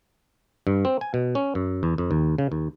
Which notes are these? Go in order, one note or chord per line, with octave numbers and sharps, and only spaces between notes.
G2
C4
G#5
B2
C#4
F#2
E2
F2
D#2
C#3
D#2